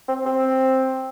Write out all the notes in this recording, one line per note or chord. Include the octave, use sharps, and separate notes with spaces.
C4
C4